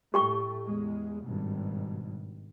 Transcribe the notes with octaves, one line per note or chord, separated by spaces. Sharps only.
A2 A3 G4 G5 C#6
E2 G#3
G#1 G2 B2